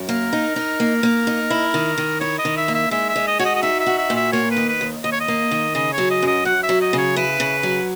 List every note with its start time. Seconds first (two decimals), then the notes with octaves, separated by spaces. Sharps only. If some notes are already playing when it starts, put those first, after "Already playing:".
Already playing: F#2
0.09 A#3 A#4
0.33 D#4
0.56 D#4
0.80 A#3
1.03 A#3
1.27 D#4
1.50 E4
1.74 D#3
1.98 D#3
2.20 E4 C#5
2.39 D#5
2.45 D#3
2.57 E5
2.68 A#3
2.75 E5
2.91 G#3 E5
3.09 E5
3.16 G#3
3.27 D#5
3.39 F#4 C#5
3.45 D#5
3.56 D#5
3.62 D#4 E5
3.80 E5
3.86 F#4
3.98 E5
4.10 A#2
4.16 E5
4.33 A#3 C#5
4.51 B4
4.57 D#3
4.69 B4
4.81 D#2
5.04 D#2 D#5
5.12 C#5
5.20 D#5
5.28 A#3
5.51 D#3
5.75 C#3 D#5
5.93 F#3 C#5
6.10 D#5
6.22 F#2 D#5
6.45 F#2 F#5
6.63 E5
6.69 F#3
6.82 D#5
6.93 C#3
6.98 C#5
7.16 E4 B4
7.40 C#3
7.63 F#3